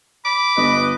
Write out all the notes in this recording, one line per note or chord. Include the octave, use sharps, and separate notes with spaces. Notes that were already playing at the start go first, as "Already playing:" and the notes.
B5 D6
G1 B4 D#5